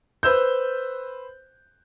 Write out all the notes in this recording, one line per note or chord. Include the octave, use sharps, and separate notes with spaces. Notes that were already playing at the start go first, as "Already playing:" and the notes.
B4 C5 E6 G6